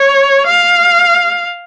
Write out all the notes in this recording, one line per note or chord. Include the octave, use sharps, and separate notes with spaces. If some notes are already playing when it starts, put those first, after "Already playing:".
Already playing: C#5
F5